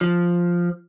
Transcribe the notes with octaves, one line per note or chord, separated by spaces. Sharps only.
F3